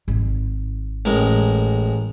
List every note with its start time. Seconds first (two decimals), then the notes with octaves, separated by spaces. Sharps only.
0.08 G#1
1.05 A1 G#3 A#4